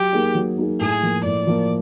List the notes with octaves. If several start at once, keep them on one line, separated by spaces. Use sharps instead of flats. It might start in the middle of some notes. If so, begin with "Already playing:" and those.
Already playing: F#3 G4
A#3 D#4 G#4
F#3
A#3 D#4 G#4
A2 G#4
F3 A#3
A2 D5
F3 A#3